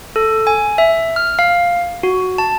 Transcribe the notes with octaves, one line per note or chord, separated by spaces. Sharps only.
A4
G#5
E5
F6
F5
F#4
A5